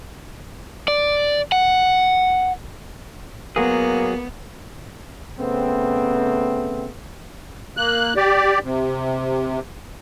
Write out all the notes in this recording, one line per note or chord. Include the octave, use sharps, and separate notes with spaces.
D5
F#5
F#3 A#3 B3 G#4
C#3 A3 B3 C4
A#3 F#6
G4 D5
C3